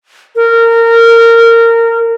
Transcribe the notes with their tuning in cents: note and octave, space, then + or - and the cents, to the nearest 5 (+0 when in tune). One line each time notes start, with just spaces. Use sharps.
A#4 -20